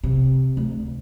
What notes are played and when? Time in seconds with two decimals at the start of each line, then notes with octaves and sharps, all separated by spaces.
0.04 C3
0.57 D2